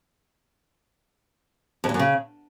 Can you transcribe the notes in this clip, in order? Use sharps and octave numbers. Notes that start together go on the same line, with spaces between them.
F2
E2
F#2
C#3